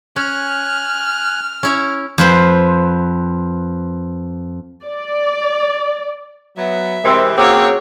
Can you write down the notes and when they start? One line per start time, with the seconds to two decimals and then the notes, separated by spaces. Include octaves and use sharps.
0.16 C#4 G#5 F6 F#6
1.63 C#4 E4 C#5
2.18 F2 B4 C5
4.84 D5
6.57 F#3 B3 E5
7.04 C3 E3 G#3 C4 A#4 C6 E6
7.38 C#3 A#3 C4 F#4 C#5 G5 D6 E6